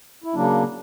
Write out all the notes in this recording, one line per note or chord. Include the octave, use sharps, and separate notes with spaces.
E4
C#3 F#3 A#3 D4